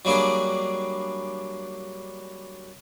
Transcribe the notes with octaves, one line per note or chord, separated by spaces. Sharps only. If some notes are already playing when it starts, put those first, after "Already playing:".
F#3 G3 A#3 D4 G#4